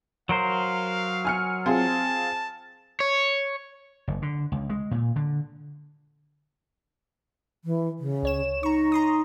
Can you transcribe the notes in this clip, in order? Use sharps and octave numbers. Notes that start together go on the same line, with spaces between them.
F#3 A#4 C5 F5
G#5 F6 C#7
C4 F4 G#4 A5
C#5
F#1
D3
C#2
G#3
A#2
D3
E3
C#3
C#2 C#5 E7
D#4 A#5 C#6
A#5 C6 D#6